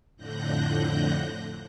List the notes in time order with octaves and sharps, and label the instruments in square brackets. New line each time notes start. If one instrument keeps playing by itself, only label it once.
[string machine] F2 A2 D3 F#6 G6 A#6